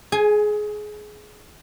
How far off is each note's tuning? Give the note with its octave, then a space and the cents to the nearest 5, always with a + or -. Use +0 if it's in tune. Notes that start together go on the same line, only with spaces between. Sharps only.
G#4 +20 G#5 -5